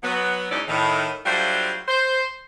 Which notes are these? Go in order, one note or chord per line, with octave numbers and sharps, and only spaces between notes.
F#3 B3
G#2 B2 C#4 D#4 E4 D5
A2 D#3
F#3 G3 A3 D4 F4 C5
C5